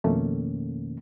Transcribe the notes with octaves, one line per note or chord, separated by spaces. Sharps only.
F2 B2 D#3 A3 A#3 C#4